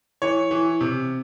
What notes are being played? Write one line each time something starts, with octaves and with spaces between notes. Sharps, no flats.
E3 C#5
E3
C3